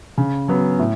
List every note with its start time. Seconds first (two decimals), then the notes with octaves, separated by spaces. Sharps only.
0.18 C#3
0.48 F#3 B3
0.79 A2